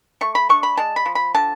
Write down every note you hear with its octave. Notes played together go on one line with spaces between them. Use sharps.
A3 C#6
B5
D4 C#6
B5
G#3 A5
B5
F3
B5
D3 A5